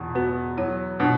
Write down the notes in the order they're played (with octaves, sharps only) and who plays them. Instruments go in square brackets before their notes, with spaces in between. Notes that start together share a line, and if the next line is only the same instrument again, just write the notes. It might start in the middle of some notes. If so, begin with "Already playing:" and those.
Already playing: [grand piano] E2 B2
[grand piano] B3 [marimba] F#4
[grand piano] F#3 [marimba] E4
[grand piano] B2 [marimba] D4